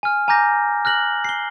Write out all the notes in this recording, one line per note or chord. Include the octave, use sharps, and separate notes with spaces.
G#5 F6
G#5 A#5 D6 G6 A#6
F6 F#6 A#6 F#7
C7 G7